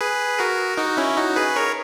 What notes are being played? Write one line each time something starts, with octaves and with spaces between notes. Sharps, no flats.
G#4 B4
F#4 A#4
D#4 F#4
C#4 E4
D#4 F#4
G#4 B4
A#4 C#5